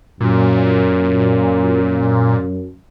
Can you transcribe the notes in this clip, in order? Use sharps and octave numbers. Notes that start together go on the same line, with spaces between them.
F#2 A#2